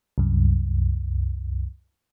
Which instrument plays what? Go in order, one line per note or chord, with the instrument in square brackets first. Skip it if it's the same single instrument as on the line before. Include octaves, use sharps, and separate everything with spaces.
[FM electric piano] C2 F#2